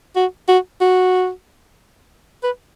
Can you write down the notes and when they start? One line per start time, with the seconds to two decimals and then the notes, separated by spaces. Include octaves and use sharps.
0.15 F#4
0.48 F#4
0.81 F#4
2.44 B4